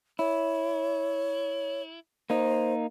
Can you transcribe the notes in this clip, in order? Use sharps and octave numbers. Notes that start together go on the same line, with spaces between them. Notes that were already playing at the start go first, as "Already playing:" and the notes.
E4 C#5
A#3 D#4 C5